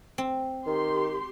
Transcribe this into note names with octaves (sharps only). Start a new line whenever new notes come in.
C4
D#3 G4 C6